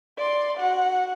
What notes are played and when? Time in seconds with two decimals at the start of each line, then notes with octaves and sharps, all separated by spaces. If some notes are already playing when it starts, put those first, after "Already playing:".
0.18 D5 C6
0.58 F#4 F#5